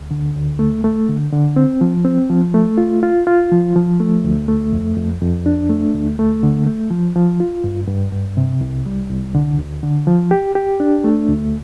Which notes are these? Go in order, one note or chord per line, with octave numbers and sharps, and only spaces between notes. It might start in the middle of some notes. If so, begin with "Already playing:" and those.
Already playing: D2
D3
D2
A3
A3
D3
D3
C4
F3
C4
F3
A3
F4
F4
F4
F3
F3
A3
D2
A3
F2
F2
F2
D4
A3
D2
A3
D3
A3
F3
F3
F4
G2
G2
G2
C3
C2
G3
C2
D3
D2
D3
F3
G4
G4
D4
A3
D2